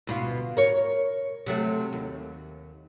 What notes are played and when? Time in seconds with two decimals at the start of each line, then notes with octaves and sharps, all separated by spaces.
0.07 D2 B2 F4
0.57 A#4 C#5
1.46 C3 F#3 A3
1.93 D#2